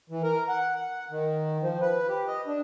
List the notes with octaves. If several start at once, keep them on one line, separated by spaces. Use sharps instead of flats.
E3
A#4
F#5
F#5
D#3
F3
B4
G4
D#5
D4